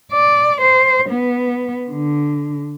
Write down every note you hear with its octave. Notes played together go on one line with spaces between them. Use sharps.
D5
C5
B3
D3